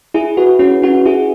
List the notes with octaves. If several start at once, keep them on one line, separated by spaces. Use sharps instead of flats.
E4 G#4
F#4 B4
C#4 F#4
C#4 F#4
E4 G#4